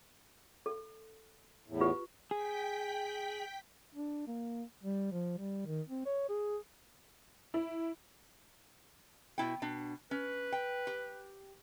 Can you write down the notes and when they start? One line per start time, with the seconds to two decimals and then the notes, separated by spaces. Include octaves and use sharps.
0.66 A4
1.68 E2 A2
1.81 F4 G4 B4
2.31 G#4 G5 B6
3.94 D4
4.27 A#3
4.83 G3
5.12 F3
5.38 G3
5.66 D#3
5.89 C4
6.06 C#5
6.29 G#4
7.54 E4
9.38 B2 E4 G5
9.62 B2 D4
10.11 C#4 B4
10.52 G5
10.87 G4